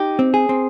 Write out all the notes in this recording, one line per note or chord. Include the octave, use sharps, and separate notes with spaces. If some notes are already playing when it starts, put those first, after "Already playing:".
Already playing: D#4 G4
C4
G#4
C4